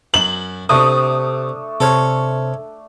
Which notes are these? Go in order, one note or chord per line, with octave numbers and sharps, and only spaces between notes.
F#2 F#7
C3 A3 D4 C#6 D#6
C3 A4 C5 C#5 F6